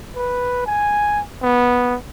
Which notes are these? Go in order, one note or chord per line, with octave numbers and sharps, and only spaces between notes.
B4
G#5
B3